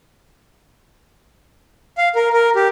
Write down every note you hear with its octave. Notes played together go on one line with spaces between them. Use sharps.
F5
A#4
A#4
G4